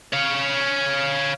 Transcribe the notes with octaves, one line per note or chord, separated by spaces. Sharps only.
C#5 F5